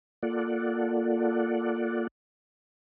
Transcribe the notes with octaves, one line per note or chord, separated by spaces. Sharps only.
A#3 F4 A4 D5 F#5